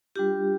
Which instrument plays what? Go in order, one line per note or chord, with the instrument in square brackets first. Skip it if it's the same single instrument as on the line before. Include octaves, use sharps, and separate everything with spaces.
[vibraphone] G3 D4 F4 G4